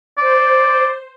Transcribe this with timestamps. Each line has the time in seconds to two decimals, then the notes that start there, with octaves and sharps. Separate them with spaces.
0.18 C5 D5